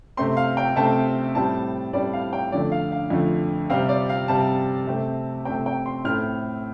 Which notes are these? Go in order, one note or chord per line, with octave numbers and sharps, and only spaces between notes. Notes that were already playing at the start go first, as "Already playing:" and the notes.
C3 A3 C4 C6
F5
G5
C3 A3 C4 A5
A2 G3 C4 A5
A2 G3 C4 D5
F5
G5
F2 D3 A3 D5
F5
F5
F2 D3 A3
C3 G3 C4 F5
D5
F5
C3 G3 C4 A5
C3 A3 C4
C3 A3 C4 G5
G5
C6
A2 A3 C4 F6